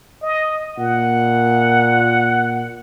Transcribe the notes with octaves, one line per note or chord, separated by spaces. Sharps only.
D#5
A#2 F#5